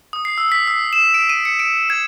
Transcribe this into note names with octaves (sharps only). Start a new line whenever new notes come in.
D#6
C7
E6
B6
E6
E7
D7
D#7
C#7
D7
G#6